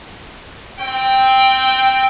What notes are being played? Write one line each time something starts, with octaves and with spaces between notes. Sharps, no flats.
C4 G5